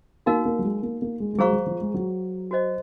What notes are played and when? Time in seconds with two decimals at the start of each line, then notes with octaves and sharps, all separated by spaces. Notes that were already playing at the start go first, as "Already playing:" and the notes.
0.26 A#3 D#4 F#4 A#4 F5
0.45 A#3
0.59 F#3
0.65 G#3
0.83 A#3
1.02 A#3
1.20 G#3
1.34 G#3
1.38 F#3 G#4 C5 F5 A#5 C#6
1.47 G#3
1.53 F#3
1.66 F3
1.81 G#3
1.94 F#3
2.51 F#4 C5 D#5